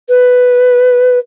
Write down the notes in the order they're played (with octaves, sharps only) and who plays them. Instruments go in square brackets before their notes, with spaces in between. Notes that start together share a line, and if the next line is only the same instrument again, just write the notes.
[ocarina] B4